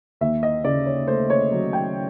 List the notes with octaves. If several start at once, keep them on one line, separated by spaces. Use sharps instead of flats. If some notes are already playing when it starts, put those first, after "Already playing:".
D#2 E5
D#5
C#3 D5
C#5
A3 C5
C#5
F#3
G5